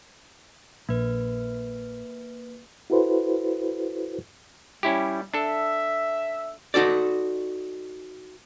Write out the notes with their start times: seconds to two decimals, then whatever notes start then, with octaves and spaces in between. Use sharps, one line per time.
0.89 A#1 A#3 B4
2.90 E4 F#4 A4 B4 C5
4.83 G3 C#4 E4 G4
5.34 D4 A4 E5
6.74 D#4 F#4 A4 D5